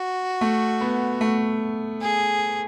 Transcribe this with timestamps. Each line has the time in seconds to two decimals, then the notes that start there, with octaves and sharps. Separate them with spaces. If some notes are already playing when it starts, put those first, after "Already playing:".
Already playing: F#4
0.41 A3
0.81 B3
1.21 A3
2.01 G#4